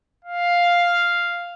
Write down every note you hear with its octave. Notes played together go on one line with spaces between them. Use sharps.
F5